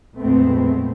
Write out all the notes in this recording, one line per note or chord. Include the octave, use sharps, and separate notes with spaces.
F2 A#2 G#3 A3 B3 C4